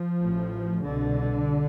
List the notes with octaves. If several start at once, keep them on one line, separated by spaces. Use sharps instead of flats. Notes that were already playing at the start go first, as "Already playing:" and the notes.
Already playing: F3
A1 A2
C2 B2 D3